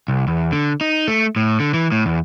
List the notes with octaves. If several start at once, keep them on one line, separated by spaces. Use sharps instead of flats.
C2
E2
D3
D#4
A3
A2
D3
E3
A2
E2